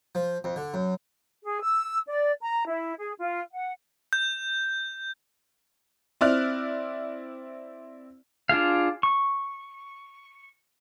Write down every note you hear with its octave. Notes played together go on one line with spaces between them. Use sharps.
F3
F2
D3
F#2
G#4
E6
D5
A#5
E4
G#4
F4
F#5
G6
C4 E4 D5 F6 F#6
D4 F4 G#4 F5
C#6